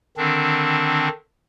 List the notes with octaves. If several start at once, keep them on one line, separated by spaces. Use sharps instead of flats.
D3 D#3 C4 D4